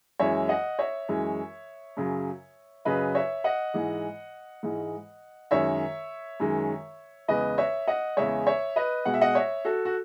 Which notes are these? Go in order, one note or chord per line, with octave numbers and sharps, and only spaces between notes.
F#2 E3 G#3 C#5 E5
D#5 F#5
C#5 E5
F#2 E3 G#3
F#2 C#3 F#3
F#2 C#3 F#3 B4 D#5
C#5 E5
D#5 F#5
G#2 E3 G#3
G#2 E3 G#3
F#2 D#3 G#3 C#5 E5
F#2 D#3 G#3
E2 C#3 G#3 B4 D#5
C#5 E5
D#5 F#5
E2 C#3 G#3 C#5 E5
C#5 E5
B4 D#5
B2 G#3 F#5
E5
D#5 F#5
C#5 E5
F#4 A4
F#4